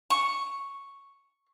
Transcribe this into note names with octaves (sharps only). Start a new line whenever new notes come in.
C#6